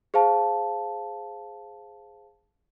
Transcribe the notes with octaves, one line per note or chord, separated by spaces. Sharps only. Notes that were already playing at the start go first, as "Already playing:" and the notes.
G#4 C5 F5 A5